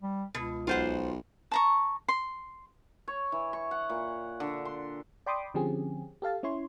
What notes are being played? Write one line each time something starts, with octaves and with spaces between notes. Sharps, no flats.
G3
C#2 B2
B1 F4 C5 F#5
A5 A#5 C#6
C6
C#5
E3
C#6
F#5
A#2
D3
C6
D5 G5 B5 C6 D6 D#6
D3 F3 C4 C#4 G4 G#4
G4 A4 F5 A5
C#4 E4 C#5 C6